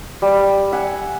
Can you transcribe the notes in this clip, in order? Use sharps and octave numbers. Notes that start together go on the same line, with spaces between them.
G3
E5 F#5 G#5